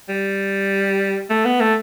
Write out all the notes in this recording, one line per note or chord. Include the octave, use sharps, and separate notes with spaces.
G3
A3
B3
A3